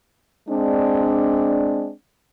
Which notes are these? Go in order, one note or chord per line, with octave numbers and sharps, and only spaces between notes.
G#3 C4 D4